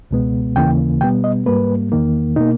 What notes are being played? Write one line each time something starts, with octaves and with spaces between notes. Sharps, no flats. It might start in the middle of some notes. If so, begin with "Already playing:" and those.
C#2 B2 G#3 B3
D#2 C#3 E3 A#3 G5
B2 G3 B3 G5
D#5
G#2 G3 A#3 B4
E2 D#3 A#3
B2 A#3 D#4